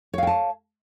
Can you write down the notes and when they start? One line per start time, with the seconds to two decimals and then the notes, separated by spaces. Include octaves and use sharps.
0.13 C#5
0.18 F5
0.23 G5
0.27 A5